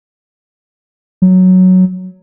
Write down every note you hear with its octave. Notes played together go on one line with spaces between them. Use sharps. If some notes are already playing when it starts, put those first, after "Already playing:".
F#3